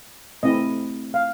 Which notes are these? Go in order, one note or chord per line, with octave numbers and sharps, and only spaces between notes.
A3 C4 E4 D#5
F5